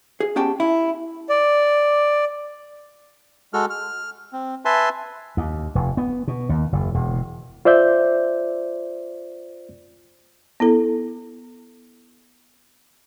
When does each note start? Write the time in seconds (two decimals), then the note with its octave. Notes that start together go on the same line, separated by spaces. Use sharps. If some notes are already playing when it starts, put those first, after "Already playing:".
0.20 G#4
0.36 B3 C#4 G4 G5 A5
0.60 E4
1.29 D5
3.53 G#3 F#4 A4 F6
3.70 F6
4.33 C4
4.65 B4 E5 G#5 A5 C6
5.37 D#2
5.75 F1
5.97 B3
6.28 B2
6.49 D#2
6.72 F#1
6.94 E1
7.65 F4 C5 D5 E5 G6
10.60 B3 E4 A4